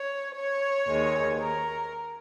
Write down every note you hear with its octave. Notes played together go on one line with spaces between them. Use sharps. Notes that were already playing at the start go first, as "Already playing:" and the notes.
Already playing: C#5
C#5
D#2 D#3 G#3
A#4